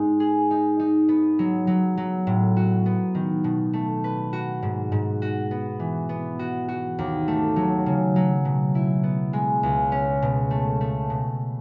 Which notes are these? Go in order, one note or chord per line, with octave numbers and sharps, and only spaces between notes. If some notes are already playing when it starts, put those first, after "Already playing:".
Already playing: G#2 G#3 D#4
G#4
D#4
D#4
B3
F#3
F#3
F#3
A2
F#4
B3
D#3
B2
A3
B4
F#4
G#2
G#2
F#4
B3
E3
B3
F#4
F#4
D#2
A3
F#3
C#3
F#3
B2
E4
B3
G#3
C#2
C#4
B2
A3
A3
B2